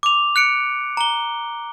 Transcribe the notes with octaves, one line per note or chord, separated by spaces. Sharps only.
D6 F7
F#6 C#7 D7
A#5 G7